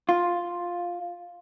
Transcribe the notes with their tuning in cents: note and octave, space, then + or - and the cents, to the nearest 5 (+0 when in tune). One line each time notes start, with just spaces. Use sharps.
F4 +5